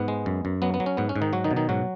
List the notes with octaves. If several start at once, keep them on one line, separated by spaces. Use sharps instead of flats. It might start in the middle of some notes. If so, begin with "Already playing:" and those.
Already playing: G#2 B3
G#3
F#2
F#2
F#3 B3
B3
F#3
C#4
G#2 B3
C#4
G#2
D#3 D#4
F#3 F#4
D#3 D#4
B2
D#3 D#4
G#2 F#3 F#4